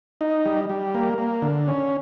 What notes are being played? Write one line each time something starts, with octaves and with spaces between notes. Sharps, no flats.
D#4
G3
G3
A#3
A#3
D3
C#4